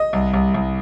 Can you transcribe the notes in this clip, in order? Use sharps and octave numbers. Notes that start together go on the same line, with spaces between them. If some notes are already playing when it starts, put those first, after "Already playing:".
Already playing: D#5
C2
C2
C2